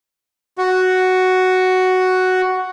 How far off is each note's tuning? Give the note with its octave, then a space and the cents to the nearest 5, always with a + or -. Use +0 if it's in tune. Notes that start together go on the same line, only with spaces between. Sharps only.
F#4 +5